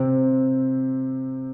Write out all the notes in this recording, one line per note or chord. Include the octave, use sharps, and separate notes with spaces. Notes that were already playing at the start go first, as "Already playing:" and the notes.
Already playing: C3 C4